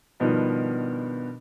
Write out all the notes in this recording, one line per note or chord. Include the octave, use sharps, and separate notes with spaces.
G2 B2 D#3 F3 B3 D4